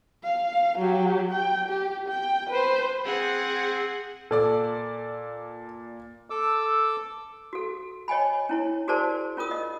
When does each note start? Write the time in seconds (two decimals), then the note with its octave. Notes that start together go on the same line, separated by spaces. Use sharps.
0.24 F5
0.79 F#3 G4
1.30 G5
1.68 G4
2.09 G5
2.50 B4 C5
3.05 C4 G#4 F#5
4.31 A#2 A4 D5 D6
6.30 A4 D6 E6
7.53 F#4 A4
8.08 C#5 D#5 G5 G#5 B5
8.49 C#4 E4 C#5
8.88 F#4 G#4 A#4 C5 D5 A5
9.37 C#4 F4 A#4 D#6
9.51 D#5